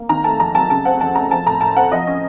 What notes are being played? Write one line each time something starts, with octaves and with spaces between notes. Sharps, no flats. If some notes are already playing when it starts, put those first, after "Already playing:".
Already playing: A#3
D#3 A#5
A3 A5
F2 A#5
F#3 A5
C#3 A5
C4 F#5
F2 A5
A3 A#5
F3 A5
A2 A#5
A2 A5
C4 F#5
F3 D#5
C#4